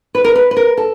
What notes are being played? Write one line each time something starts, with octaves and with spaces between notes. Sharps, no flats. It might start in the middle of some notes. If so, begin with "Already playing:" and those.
B4
A#4
B4
B4
A#4
A4